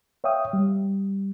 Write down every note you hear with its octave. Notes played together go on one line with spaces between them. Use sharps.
C#5 E5 F5 G5 D#6
G3